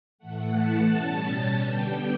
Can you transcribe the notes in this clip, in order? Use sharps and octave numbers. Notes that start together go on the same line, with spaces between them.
A2 E3 A3 F#5
A5
B2 G3 C#4
D3 G3 B3 D4 G5